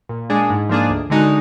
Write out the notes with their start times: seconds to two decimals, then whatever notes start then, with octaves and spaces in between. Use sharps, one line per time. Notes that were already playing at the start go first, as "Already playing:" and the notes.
0.09 A#2
0.30 G#3 D4 G#4
0.50 G#2
0.69 F3 A#3 D4 G#4
0.90 D2
1.10 D3 G#3 D#4 F#4